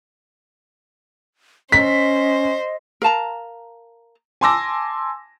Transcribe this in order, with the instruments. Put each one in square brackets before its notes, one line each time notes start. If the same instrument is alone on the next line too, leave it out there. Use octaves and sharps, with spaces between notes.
[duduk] C#4 [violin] C5 [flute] D#5 [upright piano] B6
[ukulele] A#4 F5 A5 A#5
[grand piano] G#5 A5 C6 D6 E6 A#6